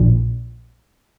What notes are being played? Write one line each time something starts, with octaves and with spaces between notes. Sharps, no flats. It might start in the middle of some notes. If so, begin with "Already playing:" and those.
Already playing: A#1 A#2